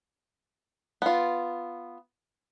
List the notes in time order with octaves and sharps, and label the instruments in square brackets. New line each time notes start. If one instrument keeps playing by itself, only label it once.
[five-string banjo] B3 F4